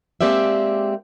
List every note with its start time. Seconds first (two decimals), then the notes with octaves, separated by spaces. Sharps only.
0.21 G#3 A#3 C4 G4 D5 E5